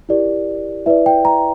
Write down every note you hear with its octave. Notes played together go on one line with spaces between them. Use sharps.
E4 G4 A#4 D5
E4 B4 D5 E5
G5
A#5